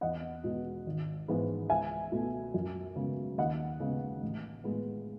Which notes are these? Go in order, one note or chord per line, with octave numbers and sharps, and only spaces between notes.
E2 D#5 F#5
B2 G#3
G#1
G#2 E3 G#3 B3
C#2 E5 G#5
B2 A3
F#2
C#3 G#3 B3
D#2 D#5 F#5
C#3 G#3 B3
A1
A2 G#3 B3